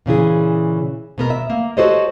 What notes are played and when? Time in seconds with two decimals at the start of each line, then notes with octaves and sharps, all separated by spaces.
0.06 A#2 C#3 E3 G#4
1.18 B2 B3 A#4
1.30 E5
1.50 A#3
1.77 F#4 G4 A4 C5 C#5 D#5